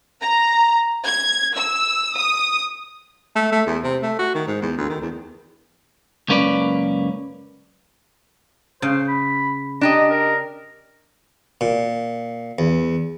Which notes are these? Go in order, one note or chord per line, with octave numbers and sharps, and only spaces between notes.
A#5
G#6
E6
D#6
A3
A3
E2
C3
A3
F#4
D#3
G#2
E2
D2
D#3
E2
C#2 F#2 A#3 C#4 B4 D5
C#3 C5
B5
D4 G4 D#5 A#5
A#4
A#2
E2